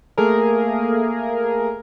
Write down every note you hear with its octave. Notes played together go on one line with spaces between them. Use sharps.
A3 A#3 G#4 A#4